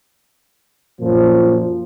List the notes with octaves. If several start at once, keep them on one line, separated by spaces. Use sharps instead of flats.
F#2 A#2 F3